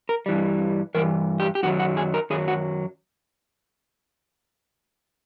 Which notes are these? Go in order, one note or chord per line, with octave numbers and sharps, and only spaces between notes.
A#4
G2 E3 G3
G2 E3 A#4
G4
G4
F#2 D#3 F#3 F#4
F#4
G#4
A#4
F#2 D#3 F#3 G#4
F#4